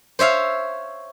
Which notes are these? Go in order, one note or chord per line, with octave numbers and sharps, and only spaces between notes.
C5 C#5 E5 F5